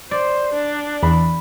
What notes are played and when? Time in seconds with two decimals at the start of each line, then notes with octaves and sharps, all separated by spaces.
0.11 C5 D5
0.53 D4
1.03 E2 B5